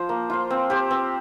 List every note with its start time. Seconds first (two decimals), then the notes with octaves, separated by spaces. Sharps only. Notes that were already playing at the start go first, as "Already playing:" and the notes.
Already playing: F3 F4 C5
0.09 A#3
0.30 F4 C5
0.50 C4
0.70 G4 C5
0.91 C4